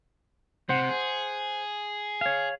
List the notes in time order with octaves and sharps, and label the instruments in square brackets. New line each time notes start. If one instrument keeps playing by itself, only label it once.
[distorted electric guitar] C3 [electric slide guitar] C5 F#5
[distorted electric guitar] G#4
[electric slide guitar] C#5 F5